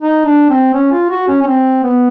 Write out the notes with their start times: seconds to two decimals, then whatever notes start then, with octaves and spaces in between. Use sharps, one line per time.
0.01 D#4
0.26 D4
0.50 C4
0.74 C#4
0.92 F4
1.10 F#4
1.28 C#4
1.42 C#4
1.47 C4
1.83 B3